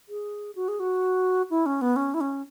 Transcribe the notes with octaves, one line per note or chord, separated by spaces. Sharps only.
G#4
F#4
G#4
F#4
E4
C#4
B3
C#4
E4
C#4